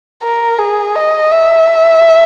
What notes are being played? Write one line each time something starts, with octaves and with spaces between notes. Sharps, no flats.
A#4
G#4
D#5
E5